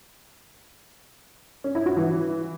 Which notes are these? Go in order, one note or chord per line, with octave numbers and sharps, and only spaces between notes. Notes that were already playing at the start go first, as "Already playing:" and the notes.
C#4
E4
F#4
E3